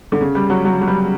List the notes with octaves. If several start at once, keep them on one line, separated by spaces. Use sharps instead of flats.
D3
C#3
G3
F#3
F#3
F#3
G3